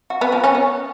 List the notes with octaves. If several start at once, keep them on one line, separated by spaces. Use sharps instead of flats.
F#4
B3
F3
C#4
B3